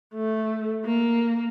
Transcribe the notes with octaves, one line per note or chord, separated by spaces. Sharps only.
A3
A#3